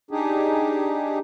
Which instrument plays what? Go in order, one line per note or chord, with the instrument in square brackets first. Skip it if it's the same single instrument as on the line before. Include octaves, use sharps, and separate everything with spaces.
[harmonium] D4 D#4 G4 G#4